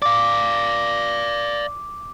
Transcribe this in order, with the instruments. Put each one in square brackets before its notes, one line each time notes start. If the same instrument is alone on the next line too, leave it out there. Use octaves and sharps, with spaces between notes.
[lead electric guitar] D5 F5 [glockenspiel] D6